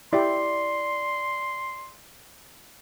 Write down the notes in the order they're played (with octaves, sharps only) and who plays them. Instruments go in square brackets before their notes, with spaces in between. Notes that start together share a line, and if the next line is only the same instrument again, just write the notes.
[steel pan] E4 G4 [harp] D5 [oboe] C6